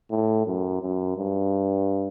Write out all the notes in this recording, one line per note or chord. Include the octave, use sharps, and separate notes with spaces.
A2
F#2
F#2
G2